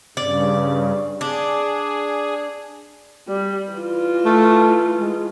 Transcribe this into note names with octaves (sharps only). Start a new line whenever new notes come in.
G2 C#3 D5
D4 G#4
G3
E3 F4
A3
G#3